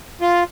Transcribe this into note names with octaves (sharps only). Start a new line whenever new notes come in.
F4